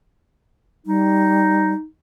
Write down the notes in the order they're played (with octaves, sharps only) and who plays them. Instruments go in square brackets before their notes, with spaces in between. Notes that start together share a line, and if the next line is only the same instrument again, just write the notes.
[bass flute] G3 [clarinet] D#4